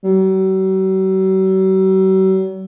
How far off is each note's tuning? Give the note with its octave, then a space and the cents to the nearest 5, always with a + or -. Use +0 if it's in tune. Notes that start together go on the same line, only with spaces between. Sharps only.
F#3 +45